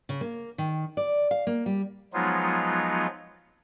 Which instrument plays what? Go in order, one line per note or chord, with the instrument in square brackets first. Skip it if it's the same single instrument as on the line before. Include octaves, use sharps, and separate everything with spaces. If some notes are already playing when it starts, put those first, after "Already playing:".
[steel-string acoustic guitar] C#3
A#3
D#3
D5
F5
A#3
G3
[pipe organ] F3 F#3 G#3 B3 D#4 F4